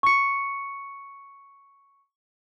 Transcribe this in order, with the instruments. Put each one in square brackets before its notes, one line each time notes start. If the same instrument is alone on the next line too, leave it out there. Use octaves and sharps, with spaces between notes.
[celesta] C#6 C#7